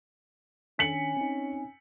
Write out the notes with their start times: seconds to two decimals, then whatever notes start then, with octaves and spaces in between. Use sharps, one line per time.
0.79 D#3 C#4 D4 G#5 B6 C#7 F#7
1.17 C4 D#4